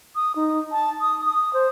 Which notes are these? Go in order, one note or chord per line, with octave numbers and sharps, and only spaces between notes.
D#6
D#4
A5
D#6
D#6
C5